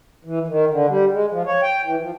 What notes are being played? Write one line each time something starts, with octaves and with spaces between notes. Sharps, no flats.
E3
D#3
D3
G3
G#3
F3
C#5
G5
E3
F3